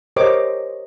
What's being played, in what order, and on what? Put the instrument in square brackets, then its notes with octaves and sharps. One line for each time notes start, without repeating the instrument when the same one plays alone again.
[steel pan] G4 A#4 C5 C#5 D#5 D6